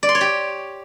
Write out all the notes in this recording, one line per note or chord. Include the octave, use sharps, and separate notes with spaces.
D5
C6
C#5
G4